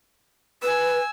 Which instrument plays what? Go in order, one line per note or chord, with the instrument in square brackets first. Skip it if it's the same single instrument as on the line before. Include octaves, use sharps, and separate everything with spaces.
[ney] B4 [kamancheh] G#5 E6